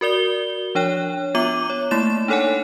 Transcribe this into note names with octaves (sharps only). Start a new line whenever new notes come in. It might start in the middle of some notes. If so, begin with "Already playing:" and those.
F#4 A#4 D5 G7
F3 D4 C#5 G5 F#6
B3 F4 E5 D6 D#7
C#5
A3 A#3 E4 A6 E7
D4 D#4 A4 C#5 F#5 G#5